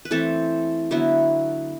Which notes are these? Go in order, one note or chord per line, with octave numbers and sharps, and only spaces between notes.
B4
E3 A3 C4 A4
D3 F#3 B3 E4